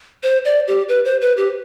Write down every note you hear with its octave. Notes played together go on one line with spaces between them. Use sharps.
C5
D5
G4
B4
C5
B4
G4